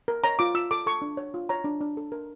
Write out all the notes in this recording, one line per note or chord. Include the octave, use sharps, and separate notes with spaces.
A#4
C#5 A#5
F4 D6
F4 E6
A4 D6
A4 C#6
D4
C#5
F4
C#5 A#5
D4
D4
A4
A#4